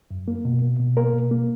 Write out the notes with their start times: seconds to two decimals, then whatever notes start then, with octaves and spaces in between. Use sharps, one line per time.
0.11 F#2
0.28 A#3
0.45 B2
0.62 A#3
0.79 B2
0.97 A#3 A#4
1.13 B2
1.31 A#3